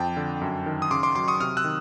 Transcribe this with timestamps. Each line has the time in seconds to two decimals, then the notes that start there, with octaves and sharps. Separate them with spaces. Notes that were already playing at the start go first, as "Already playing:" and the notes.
Already playing: F2 G5 A5
0.17 D3
0.41 F#2
0.66 D#3
0.82 D#6
0.91 C#3 C6 D6
1.03 C6 D6
1.15 F#3 C6 D6
1.28 C#6 D#6
1.40 C3 D#6 F6
1.57 E6 F#6
1.64 D#3